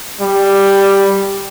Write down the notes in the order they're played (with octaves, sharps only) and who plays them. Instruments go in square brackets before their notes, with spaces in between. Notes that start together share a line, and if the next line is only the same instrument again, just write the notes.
[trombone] G3